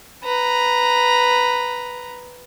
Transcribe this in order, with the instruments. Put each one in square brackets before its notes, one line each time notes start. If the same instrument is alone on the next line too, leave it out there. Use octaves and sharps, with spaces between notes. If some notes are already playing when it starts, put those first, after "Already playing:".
[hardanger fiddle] B4 A#5